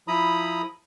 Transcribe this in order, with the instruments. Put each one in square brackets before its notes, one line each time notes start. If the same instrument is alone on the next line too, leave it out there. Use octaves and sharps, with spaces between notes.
[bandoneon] F3 E4 A#5 B5 D#6